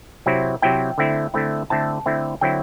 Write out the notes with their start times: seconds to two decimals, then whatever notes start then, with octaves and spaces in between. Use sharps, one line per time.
0.26 C3 F#3 C4 E4
0.62 C3 F#3 C4 E4 G5
0.98 D3 A3 C4 E4
1.34 D3 A3 C4 E4
1.70 D3 A3 C4 E4 A5
2.06 D3 A3 C4 E4
2.41 D3 F#3 C4 E4 G5